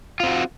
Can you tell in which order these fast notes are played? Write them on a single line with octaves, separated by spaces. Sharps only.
F4 C4 F#4